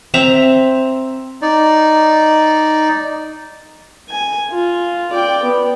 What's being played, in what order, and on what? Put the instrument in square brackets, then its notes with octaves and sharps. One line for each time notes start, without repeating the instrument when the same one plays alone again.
[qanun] C4 E5 A#5
[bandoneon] D#4 D5
[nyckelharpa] G#5
F4
D5 G5
B3